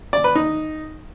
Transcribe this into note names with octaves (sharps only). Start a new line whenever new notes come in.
D5
B4
D#4